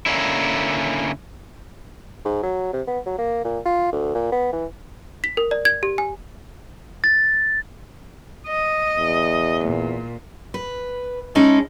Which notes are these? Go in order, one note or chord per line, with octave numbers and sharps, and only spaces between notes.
D3 A#3 C#4 E4
G#2
F#3
C3
B3
F#3
A#3
A#2
F4
D2
A#2
B3
E3
B6
A#4
D5
G#6
G4
G#5
A6
D#5
E2
A#2
B4
G#3 C#4 D#4 E4 G#4 A4